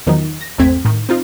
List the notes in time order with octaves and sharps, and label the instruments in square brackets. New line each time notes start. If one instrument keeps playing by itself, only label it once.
[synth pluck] E2 D#3 F3 F#3 D#4
A#6
G#1 E2 A3 C4 G#6 B6
A2 D#3
C4 D#4 F4